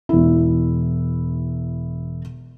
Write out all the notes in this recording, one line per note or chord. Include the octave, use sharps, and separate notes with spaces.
E1 E4